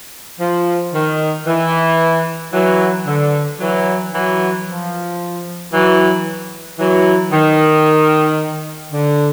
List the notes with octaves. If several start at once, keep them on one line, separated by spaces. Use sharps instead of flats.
F3
D#3
E3
E3 F#3
D3
E3 F#3
E3 F#3
F3
E3 F#3
E3 F#3
D#3
D3